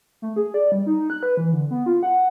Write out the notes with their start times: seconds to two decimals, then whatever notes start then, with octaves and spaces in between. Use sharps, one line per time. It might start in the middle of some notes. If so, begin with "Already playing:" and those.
0.22 A3
0.36 G#4
0.54 D5
0.72 G3
0.86 D#4
1.10 F#6
1.23 B4
1.37 E3
1.53 D3
1.71 B3
1.86 F4
2.03 F#5